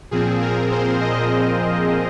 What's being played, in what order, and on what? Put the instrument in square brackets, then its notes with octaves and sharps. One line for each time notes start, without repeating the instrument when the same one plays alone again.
[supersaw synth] A#2 F3 C4 G#4
A#4
C5
D#5